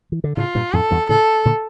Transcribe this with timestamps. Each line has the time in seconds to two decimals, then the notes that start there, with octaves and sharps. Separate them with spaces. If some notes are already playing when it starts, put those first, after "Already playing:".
0.12 E3
0.24 D3
0.37 A2 C#3 F4
0.55 G2 A#2
0.73 F2 A2 A4
0.91 E2 G2
1.09 A2 C#3 A4
1.45 A#2 D3